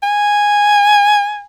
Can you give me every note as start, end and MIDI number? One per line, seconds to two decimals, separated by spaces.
0.03 1.45 80